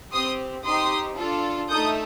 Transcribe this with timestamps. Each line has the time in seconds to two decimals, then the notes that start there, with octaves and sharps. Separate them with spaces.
0.12 C4 G4 C6 D#6
0.65 C4 D#4 G4 C6 D#6
1.17 D4 F4 A4
1.69 A3 D#4 A4 D#6 G6